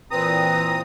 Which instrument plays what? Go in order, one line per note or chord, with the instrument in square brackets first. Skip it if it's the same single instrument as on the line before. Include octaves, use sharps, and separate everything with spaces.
[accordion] A#2 C4 D#6 [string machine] E3 [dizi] B4 [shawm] A#5